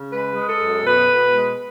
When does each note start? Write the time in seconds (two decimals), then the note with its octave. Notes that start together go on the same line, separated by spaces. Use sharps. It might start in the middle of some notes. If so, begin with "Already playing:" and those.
Already playing: C#3
0.11 G#3 B4
0.36 G#3
0.48 A4
0.59 F#2
0.85 B2 B4
1.09 B2
1.34 G#3